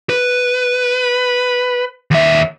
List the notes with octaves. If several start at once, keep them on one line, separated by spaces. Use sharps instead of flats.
B4
D#2 E5